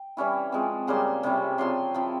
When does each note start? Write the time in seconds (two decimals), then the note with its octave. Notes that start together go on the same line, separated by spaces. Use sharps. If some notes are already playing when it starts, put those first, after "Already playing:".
Already playing: G5
0.17 E3 G3 C#4 E4
0.52 F3 G#3 C4
0.87 C#3 G3 A#3 C6
1.23 C3 G3 C#4 E4
1.58 C#3 F3 C4 C6
1.94 F3 C4 E4